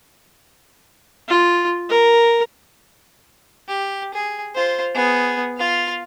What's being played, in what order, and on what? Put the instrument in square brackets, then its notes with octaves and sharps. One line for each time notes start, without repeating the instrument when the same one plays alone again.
[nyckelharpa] F4
A#4
[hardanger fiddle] G4
G#4
F4 C5
B3 G#4
F4 F5